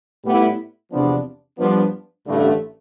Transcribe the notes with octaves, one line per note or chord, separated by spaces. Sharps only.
A2 G3 B3 E4
E2 C3 F3 B3 D4
G2 F3 B3 D4
A1 G2 D3 A3